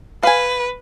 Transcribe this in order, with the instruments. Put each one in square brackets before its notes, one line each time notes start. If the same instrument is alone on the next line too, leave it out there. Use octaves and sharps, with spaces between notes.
[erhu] B4 [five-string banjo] F5 G#5